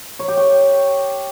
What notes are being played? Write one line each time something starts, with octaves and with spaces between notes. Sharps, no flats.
C#5
G4
G5